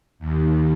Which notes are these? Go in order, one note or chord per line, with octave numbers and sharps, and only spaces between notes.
D#2